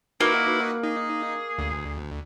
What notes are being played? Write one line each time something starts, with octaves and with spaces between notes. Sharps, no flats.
A#3 D#4 E4 F#4 B4
D#4 G#4
D2